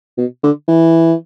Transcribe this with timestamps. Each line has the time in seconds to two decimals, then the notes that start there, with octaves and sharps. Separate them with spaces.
0.17 B2
0.43 D3
0.68 E3